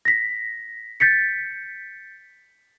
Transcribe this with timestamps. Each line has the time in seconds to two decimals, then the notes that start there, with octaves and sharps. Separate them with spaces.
0.05 A#6 B6
1.00 G6 A6 B6 C#7